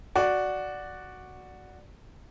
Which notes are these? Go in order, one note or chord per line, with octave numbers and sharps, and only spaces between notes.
F#4 D5